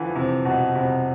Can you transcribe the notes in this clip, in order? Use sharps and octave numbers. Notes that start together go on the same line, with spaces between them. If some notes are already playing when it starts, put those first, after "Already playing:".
Already playing: D3 E3 F3
C3
B2
C3